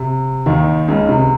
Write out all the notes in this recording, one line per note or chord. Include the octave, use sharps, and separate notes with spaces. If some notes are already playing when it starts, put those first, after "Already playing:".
Already playing: C3
D#2 D#3
C#2 C#3
C3